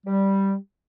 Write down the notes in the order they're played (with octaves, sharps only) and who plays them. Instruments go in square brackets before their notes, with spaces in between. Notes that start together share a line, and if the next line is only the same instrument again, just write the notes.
[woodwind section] G3